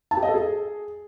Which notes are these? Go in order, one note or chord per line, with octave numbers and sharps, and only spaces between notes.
A5
G4
D#5
A4
G#4